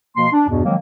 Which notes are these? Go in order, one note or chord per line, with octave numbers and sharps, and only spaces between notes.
B2 F3 A#3 C6
D4
E2 G2 B2
D#3 F3 F#3 G#3 A#3 C4